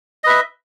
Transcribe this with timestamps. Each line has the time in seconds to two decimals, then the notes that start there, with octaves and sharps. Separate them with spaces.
0.24 D#5
0.26 B4
0.29 E5